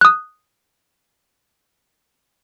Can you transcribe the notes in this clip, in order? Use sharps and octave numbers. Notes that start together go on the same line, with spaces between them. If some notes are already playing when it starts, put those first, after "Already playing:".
D#6 F#6